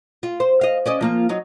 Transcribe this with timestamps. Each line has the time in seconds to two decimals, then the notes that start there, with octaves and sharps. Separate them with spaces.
0.23 F4
0.40 C5
0.61 D#5 F5
0.86 C#4 D5 D#5
1.01 F3 A#3 F4
1.29 F#3 D#4